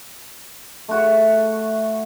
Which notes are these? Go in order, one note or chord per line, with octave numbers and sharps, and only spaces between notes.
A3 F#4